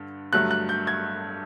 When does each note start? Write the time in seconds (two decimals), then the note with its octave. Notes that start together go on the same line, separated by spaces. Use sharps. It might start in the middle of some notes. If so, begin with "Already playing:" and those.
Already playing: G2 D3
0.33 G2 D3 F#3 A3 F#6
0.51 F#6
0.69 G6
0.87 G#6